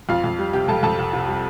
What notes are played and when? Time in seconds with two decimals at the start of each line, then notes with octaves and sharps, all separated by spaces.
0.09 F2 F4 F5
0.24 F2
0.38 G3
0.53 C3 G4 G5
0.68 F2 A4 A5
0.83 F2 A4 A5
0.98 C2
1.13 C2
1.27 G3